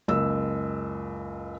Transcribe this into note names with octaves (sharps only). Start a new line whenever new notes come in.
F#1 C#2 E6